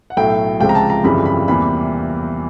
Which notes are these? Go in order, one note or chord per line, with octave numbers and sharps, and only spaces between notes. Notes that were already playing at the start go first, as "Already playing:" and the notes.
F#5
B1 A2 F#3 A3 G5
C#2 C3 F3 G#3 G5
A#5
A5
A#5
G1 F2 C#3 E3 G3 B5
B5
E2 C3 E3 G3 A#3 B5